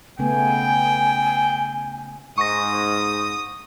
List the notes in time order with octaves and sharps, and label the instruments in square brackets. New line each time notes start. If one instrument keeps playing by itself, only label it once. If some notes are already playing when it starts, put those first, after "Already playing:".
[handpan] C#3 A3 B3 [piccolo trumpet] G5 [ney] G#5
[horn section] G#2 [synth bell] C#6 A#6 [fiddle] D#6